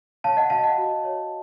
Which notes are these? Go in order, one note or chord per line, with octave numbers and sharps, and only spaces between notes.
C#5 F5 A5
D#5 F#5
F#4 F5 A5
D#5 F#5
F#4
C#5